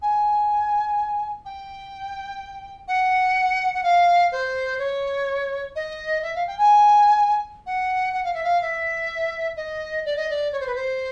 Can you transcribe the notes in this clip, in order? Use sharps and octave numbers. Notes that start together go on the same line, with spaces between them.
G#5
G5
F#5
F#5
F5
C5
C#5
D#5
E5
F5
G5
G#5
F#5
F#5
F5
E5
F5
E5
D#5
D5
D#5
D5
C#5
C5
B4
C5